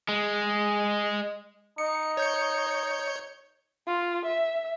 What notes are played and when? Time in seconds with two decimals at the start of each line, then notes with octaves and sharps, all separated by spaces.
0.09 G#3
1.78 D#4 C#7
2.17 C#5 G6 C#7
3.87 F4
4.25 E5